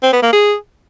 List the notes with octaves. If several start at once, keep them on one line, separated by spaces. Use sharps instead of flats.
C4
B3
A#3
G#4